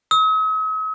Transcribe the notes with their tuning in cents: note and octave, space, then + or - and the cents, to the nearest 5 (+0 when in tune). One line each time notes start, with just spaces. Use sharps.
D#6 +45